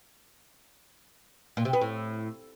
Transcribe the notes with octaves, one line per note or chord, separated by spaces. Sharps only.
A#2
C3
B3
A2